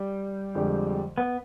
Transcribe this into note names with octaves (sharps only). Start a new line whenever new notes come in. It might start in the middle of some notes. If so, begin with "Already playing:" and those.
Already playing: G3
F2 D3 G#3 D4 G4
B3